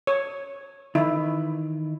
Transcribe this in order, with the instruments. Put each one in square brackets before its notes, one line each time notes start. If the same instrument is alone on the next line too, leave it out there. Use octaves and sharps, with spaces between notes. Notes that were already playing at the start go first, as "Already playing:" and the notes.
[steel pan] C#5
[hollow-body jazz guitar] D#3 E3 [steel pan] E4